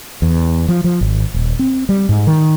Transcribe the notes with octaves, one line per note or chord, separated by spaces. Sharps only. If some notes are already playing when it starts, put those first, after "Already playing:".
E2
F3
F3
G#1
D#1
C4
G3
G#2
D#3